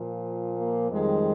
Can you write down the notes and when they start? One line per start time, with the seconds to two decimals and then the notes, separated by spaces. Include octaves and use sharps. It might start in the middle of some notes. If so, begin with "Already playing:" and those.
Already playing: A#2 F3
0.56 A#3
0.89 F2 D#3 G3 G#3